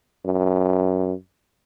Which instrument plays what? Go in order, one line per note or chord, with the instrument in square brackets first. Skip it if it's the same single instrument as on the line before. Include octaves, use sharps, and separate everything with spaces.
[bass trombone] F#2